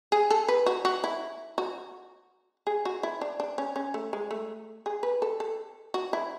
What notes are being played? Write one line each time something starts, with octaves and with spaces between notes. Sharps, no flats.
G#4
A4
B4
F#4
F#4
E4
F#4
G#4
F#4
E4
D4
D4
C#4
C#4
A3
G#3
A3
G#4
B4
A4
A4
F#4
E4